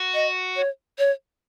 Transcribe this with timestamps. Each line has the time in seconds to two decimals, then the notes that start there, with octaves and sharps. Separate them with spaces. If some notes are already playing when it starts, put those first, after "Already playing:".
Already playing: F#4
0.14 D#5
0.56 C#5
0.98 C#5